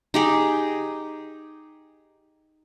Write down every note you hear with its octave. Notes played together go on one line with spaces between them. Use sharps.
D#4 G4 G#4